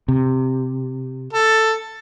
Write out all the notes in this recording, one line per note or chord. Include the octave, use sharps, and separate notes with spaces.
C3
A4